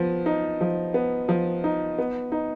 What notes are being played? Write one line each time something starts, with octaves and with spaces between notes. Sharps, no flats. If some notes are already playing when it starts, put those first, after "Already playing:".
Already playing: F3 B3
D#4
F3
B3
F3
D#4
B3
D#4